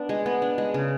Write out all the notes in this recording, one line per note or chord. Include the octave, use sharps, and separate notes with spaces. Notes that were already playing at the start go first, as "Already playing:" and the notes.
Already playing: B3 D4
G#3
B3
D4
G#3
C#3